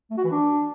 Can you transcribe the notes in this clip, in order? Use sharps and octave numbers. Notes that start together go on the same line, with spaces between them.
A3
F#4
E3
D4